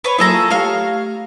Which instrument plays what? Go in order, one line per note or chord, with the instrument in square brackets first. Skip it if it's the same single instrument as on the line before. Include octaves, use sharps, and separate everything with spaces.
[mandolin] B4 C#5
[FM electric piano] F#3 A#3 E4 [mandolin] G#4 A4 A#5
[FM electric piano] F4 F5 C#6
[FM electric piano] A3 G4 [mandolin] C#5 F5